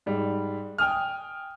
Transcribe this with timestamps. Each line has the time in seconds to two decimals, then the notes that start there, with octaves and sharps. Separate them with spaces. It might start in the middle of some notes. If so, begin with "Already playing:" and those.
0.06 G#2 G3
0.78 G5 G#5 D#6 F6